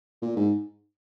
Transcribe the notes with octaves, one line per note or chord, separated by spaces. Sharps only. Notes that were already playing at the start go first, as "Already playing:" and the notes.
A#2
G#2